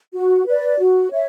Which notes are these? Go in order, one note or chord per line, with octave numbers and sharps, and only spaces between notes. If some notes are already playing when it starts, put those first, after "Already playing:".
F#4
B4 D5
F#4
C#5 E5